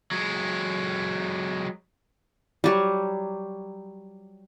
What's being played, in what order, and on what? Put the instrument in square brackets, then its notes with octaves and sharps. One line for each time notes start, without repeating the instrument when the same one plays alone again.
[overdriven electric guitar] F#3 G#3
[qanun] F#3 G3